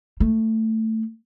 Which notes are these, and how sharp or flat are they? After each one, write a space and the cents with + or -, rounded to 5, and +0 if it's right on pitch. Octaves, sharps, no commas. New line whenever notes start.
A3 +15